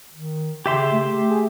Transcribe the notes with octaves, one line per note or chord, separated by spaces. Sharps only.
D#3
C#3 G4 E5 C6
A3
G#4